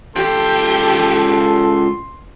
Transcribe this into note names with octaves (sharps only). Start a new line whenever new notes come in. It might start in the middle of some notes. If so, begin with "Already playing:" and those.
C#2 G4 A4 G5 C6